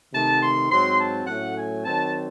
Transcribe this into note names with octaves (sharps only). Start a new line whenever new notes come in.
C3 D#3 A3 A5
C6
G#2 F#3 C4 C6
A5
A2 F#3 A3 C#4 F#5
G#5
D#3 F#3 C4 A5